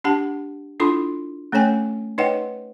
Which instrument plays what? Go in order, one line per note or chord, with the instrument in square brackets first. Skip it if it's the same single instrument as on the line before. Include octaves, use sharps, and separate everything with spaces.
[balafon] D4 G4 F#5 A5
D4 E4 F4 A4 B5 C6
A3 C#4 A4 C#5 G5 G#5
D#4 B4 C#5 D#5 F#5 G5